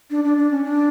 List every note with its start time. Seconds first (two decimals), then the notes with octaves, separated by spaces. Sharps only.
0.10 D4
0.24 D4
0.37 D4
0.51 C#4
0.64 D4